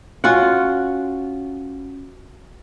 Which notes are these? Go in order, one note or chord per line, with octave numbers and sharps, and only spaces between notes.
C#4 F4 F#4 F#5